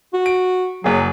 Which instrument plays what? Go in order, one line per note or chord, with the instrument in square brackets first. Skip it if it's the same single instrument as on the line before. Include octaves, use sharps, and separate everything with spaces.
[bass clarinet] F#4
[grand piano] D7
[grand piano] F#1 G#4 [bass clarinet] F#3